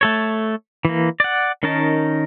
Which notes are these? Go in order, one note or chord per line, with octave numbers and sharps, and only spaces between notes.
A3 A4 C#5
E3 A#3
D5 F#5
D#3 C#4 D#4 A#4 A5